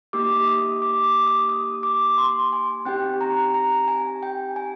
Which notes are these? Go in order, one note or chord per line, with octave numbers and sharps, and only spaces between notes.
A#3 D#4 G4 D6
D#6
D6
D6
D#6
D#6
D6
C6
G#5
C4 D#4 G4 G5
A#5
A#5
G#5
G5
G#5